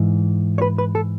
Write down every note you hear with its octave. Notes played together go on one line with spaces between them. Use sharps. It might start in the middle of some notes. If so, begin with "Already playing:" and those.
Already playing: G#2 E3
C#5
B4
B4
A4